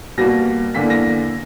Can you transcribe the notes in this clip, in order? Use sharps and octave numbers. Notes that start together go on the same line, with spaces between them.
B2 G3 A#3 A#6
E2 D3 A#3 B6
A#6